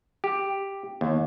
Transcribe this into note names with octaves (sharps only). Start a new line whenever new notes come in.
G4
D#2